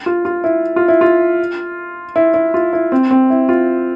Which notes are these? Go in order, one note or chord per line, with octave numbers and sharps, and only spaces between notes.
F4
F4
E4
F4
E4
F4
E4
E4
F4
E4
C4
C4
E4
F4